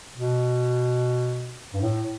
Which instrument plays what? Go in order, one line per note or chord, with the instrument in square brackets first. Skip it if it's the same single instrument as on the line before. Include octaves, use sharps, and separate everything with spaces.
[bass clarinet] B2
G2
A2